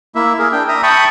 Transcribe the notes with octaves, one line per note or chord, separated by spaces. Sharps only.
A#3 E4 E5
G#4 A#4
D4 G5
E5 A#5 D#6
G5 A5 B5 C#6 D#6